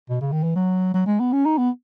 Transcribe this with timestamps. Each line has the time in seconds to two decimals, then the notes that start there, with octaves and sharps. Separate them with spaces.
0.10 B2
0.21 C#3
0.32 D#3
0.43 E3
0.56 F#3
0.94 F#3
1.07 G#3
1.20 B3
1.33 C#4
1.45 D#4
1.58 B3